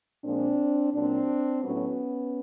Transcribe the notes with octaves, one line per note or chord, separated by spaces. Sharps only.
A#2 F3 G#3 C4 D4
A#2 F#3 C4 D4
A2 F#3 B3 C#4